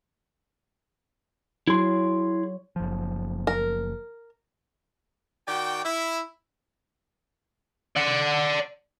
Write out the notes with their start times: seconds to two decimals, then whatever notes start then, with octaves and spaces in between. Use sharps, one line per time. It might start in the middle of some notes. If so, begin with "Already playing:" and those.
1.68 F#3 E4 G#4 C6
2.76 F#1 F3
3.47 A#4
5.48 D#3 F#4 D5 G5
5.84 E4
7.96 D5 F#5